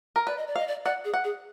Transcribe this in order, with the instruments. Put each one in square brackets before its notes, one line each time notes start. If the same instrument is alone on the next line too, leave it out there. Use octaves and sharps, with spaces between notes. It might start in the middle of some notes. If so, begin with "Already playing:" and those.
[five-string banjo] A#4
[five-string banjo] B4 [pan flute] D5
[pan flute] D#5
D5
[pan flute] D#5 [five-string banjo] F5
[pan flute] D5
[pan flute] D5 [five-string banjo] F#5
[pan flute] G#4
[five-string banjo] F#5
[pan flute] G#4